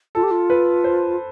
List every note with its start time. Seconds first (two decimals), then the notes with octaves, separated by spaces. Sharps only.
0.15 F4 A4
0.23 G4
0.31 F4
0.50 B4
0.84 C5